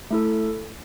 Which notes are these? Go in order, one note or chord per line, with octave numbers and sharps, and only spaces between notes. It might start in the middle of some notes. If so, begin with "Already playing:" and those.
A3 E4 A4